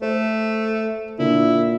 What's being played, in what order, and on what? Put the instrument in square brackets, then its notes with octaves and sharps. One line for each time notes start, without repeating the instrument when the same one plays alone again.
[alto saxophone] A3 [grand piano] C5
[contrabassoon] A#2 [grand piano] D3 [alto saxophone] E4